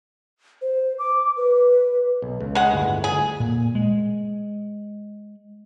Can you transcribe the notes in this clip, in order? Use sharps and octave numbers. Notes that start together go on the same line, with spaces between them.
C5
D6
B4
B1
C#2
G#3 F#5
G1 D2 A2
G#4
A#2
G#3